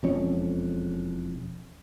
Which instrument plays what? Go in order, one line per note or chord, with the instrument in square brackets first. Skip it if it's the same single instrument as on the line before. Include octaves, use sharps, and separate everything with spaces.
[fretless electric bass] E1 F2 C#4